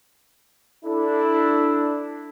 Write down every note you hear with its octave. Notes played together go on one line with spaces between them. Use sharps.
D4 E4 A4